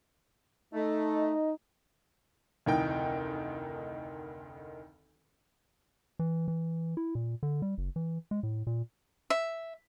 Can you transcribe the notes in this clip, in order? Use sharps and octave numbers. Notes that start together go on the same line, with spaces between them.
A3 D#4 D#5
F1 D2 D#3 E3 D#4 G5
E3
E3
E4
A#2
D3
G3
F#1
E3
G#3
A2
A#2
E5